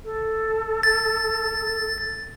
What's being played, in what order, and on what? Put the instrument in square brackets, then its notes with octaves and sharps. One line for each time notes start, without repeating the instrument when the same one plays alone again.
[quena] A4
[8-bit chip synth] A6